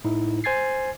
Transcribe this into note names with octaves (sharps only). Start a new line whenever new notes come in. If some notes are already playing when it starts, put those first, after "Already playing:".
A2 D#4 E4
C5 G#5 G#6 A6 C7